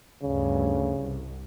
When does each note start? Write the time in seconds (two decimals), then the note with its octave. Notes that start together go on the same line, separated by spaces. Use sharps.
0.23 D2 G2 C#3
1.00 C2